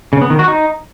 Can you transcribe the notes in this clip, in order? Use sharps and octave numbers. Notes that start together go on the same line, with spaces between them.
C#3
B3
D#3
F#4
D#4